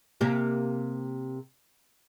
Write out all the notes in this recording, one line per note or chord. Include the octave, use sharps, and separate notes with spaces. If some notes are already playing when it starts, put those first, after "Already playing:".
C3 A#3 G4